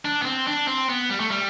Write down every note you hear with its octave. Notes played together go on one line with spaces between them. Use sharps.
D4
B3
C4
D4
C4
B3
G3
A3
G3